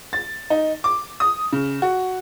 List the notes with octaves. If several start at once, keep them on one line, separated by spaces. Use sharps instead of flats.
A6
D#4
D6
D#6
C#3
F#4